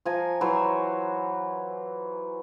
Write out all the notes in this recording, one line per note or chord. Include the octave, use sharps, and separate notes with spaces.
F3 G#5 A#5
E3 F#3 C5 C#5